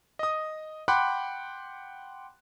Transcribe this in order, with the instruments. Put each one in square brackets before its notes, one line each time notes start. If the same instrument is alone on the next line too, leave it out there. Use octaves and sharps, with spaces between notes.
[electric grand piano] D#5 D#6
F#5 G5 B5 C6 D6 F#6